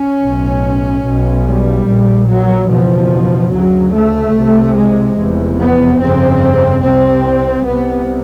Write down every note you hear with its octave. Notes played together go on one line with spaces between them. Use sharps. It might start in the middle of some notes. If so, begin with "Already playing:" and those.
Already playing: C#4
B1 A2
B1 B2
G3
A#1 A#2
F#3
F#1 E2 B2 F3
D2 C#3 F#3
A3
C2 C3
G#3
F1 E2 C3
B3
G1 F2 C#3 C4
C2 C3 C4
C2 C3 B3